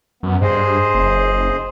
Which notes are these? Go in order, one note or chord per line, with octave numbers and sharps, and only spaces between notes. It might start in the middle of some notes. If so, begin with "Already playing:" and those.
F#2 B3
G2 G#4 C5 D#5
F#1